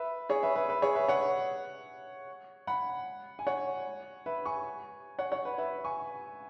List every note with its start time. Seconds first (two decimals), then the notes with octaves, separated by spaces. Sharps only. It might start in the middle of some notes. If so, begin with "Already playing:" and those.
Already playing: B4 E5
0.29 G#4 C#5
0.43 B4 E5
0.55 B4 E5
0.69 B4 E5
0.82 G#4 C#5
0.95 B4 E5
1.08 C#5 F#5
2.67 F#5 B5
3.39 G#5
3.47 C#5 F#5
4.26 B4 E5
4.45 G#5 C#6
5.19 C#5 F#5
5.32 C#5 F#5
5.45 B4
5.58 B4 E5
5.84 G#5 C#6